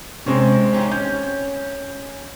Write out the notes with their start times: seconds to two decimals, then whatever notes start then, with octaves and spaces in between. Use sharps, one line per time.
0.26 C3 G#3 C4 C#4
0.73 C#4 D#4 G4
0.92 C#4 G6